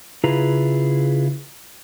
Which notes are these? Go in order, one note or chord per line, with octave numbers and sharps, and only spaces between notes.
C#3 E4 F4 G#4 B4 A#5